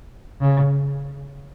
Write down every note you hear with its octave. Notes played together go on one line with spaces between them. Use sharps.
C#3